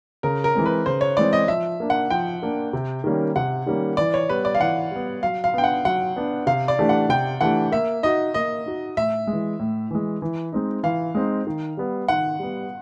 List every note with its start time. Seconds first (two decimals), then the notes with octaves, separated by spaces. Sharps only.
0.23 C#3 A#4
0.44 A#4
0.55 E3 G#3 C4
0.66 B4
0.86 C#3 C5
1.01 C#5
1.17 E3 G#3 C4 D5
1.33 D#5
1.48 F3 E5
1.80 A#3 D4
1.90 F#5
2.10 F3 G5
2.42 A#3 D4
2.73 C3
3.04 D#3 G3 A#3 C#4
3.36 C3 F#5
3.66 D#3 G3 A#3 C#4
3.97 E3 D5
4.14 C#5
4.29 G3 B3 B4
4.45 D5
4.55 F5
4.60 E3 F#5
4.91 G3 B3
5.23 F#3 F5
5.44 F5
5.54 B3 D4 G5
5.64 F#5
5.85 F#3 F#5
6.16 B3 D4
6.47 C3 F5
6.68 D5
6.79 E3 A3 D4 G4
6.89 F#5
7.09 C3 G5
7.41 E3 A3 D4 G4 F#5
7.72 A#3 E5
8.03 D#4 F#4 D#5
8.34 A#3 D#5
8.66 D#4 F#4
8.97 A2 E5
9.27 G#3
9.33 E3
9.59 A2
9.91 E3 G#3
10.22 E3
10.52 G#3 C4 D#4
10.83 E3 F5
11.15 G#3 C4 D#4
11.47 D#3
11.77 G3 B3
12.08 D#3 F#5
12.39 G3 B3